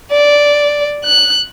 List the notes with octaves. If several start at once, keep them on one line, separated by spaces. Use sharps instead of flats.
D5
F#6